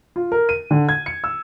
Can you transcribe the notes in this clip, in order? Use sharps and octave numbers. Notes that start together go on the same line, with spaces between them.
F4
A#4
D#7
D3
G#6
C#7
E6